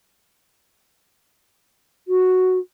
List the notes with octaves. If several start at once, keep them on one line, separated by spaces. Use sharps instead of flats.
F#4